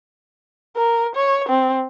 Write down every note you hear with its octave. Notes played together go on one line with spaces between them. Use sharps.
A#4
C#5
C4